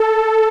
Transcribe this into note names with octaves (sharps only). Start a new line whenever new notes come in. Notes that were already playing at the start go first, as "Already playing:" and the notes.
Already playing: A4